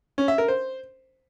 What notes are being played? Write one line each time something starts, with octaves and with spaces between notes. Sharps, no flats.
C#4
E5
A#4
C5